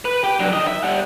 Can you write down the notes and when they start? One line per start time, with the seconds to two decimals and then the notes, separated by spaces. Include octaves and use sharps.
0.05 B4
0.24 G4 G5
0.40 F#3 D4
0.53 D#3 D#5
0.67 E5
0.84 G3 F#5